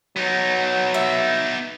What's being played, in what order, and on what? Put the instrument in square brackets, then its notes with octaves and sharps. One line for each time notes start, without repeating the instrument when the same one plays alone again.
[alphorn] F#3 [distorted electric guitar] B3 D#4
[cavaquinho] E5